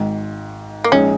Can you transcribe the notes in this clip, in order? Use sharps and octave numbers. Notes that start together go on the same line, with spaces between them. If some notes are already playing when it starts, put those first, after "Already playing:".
Already playing: G#1 G#2 D#3
A#3
A#1 G#3 C#4 D#4